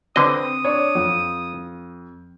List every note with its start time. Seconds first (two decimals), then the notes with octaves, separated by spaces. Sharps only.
0.16 D3 C4 B4 D#5 D6 D#6
0.65 D4 C#5
0.95 F2